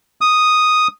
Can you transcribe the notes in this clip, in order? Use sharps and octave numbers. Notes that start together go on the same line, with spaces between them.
D#6